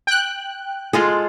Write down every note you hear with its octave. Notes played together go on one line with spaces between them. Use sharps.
G5 F#6
G#3 F4 G#4 A4 D#5 F5